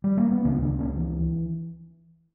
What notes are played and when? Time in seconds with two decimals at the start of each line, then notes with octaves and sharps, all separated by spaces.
0.04 G3
0.17 A#3
0.31 B3
0.44 C#2 C#3 A#3 C#4
0.62 B3 D4
0.79 A#3 C#4
0.97 E3